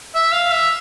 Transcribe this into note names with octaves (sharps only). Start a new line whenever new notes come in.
E5
F5
E5